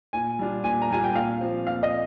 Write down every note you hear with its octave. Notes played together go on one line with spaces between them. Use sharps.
A#2 G#5
G3 D4 F4
A#2 G#5
A#5
G3 D4 F4 G#5
G5
A#2 F5
F3 C4
A#2 F5
D#5